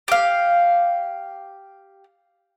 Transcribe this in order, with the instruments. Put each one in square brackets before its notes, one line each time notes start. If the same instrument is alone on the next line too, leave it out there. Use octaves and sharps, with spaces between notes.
[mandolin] G4 F5